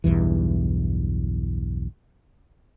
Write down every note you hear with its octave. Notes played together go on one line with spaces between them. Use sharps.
B1 E2 G2 E3